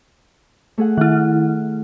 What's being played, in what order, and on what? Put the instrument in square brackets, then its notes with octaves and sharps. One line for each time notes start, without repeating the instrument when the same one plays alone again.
[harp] A3 G#4 F#5
[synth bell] D#3 E4 [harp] F#6